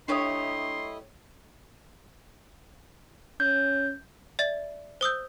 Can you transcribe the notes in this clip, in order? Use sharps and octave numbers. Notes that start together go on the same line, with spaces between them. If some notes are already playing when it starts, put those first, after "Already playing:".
A3 D4 E4 G4 C#5 D#5 C6 D#6
C#4 G6
D5 E5 A6
C5 D#6 E6 G6